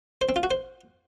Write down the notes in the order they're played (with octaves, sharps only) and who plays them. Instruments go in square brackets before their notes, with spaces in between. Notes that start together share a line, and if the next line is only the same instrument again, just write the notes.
[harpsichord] C5
C4
F4
F#4
C5